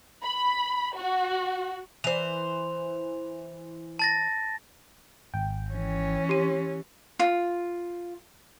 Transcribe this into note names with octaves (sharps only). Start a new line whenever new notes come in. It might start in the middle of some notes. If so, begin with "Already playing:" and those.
B5
F#4
E3 C5 F7
A5 A6 A#6
G#1 G5
E3 C#4
G4 C6 D#7
F4